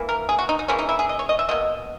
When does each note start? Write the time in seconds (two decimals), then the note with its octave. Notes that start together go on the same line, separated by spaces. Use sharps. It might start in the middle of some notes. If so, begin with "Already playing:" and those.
Already playing: E3 A#3
0.09 A#4
0.29 G#4
0.39 F#4
0.49 D#4
0.59 D#4
0.68 C#3 E3 A#3 C#4
0.79 D#4
0.89 E4
0.99 G#4
1.09 D#5
1.19 C#5
1.29 D#5
1.39 E5
1.49 B2 A#3 D#5